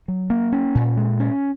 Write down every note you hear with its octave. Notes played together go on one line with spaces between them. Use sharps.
F#3
A#3
C#4
A#2
G#3
C#4